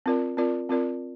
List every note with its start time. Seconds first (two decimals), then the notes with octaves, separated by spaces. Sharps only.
0.06 C4 F4 A#4 D5
0.37 C4 F4 A#4 D5
0.69 C4 F4 A#4 D5